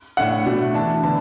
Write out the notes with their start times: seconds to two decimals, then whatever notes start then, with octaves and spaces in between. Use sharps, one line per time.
0.17 A2 A3 D4 F#5
0.46 B2 A3 D4
0.74 E3 D4 A5
1.03 D3 B3 A5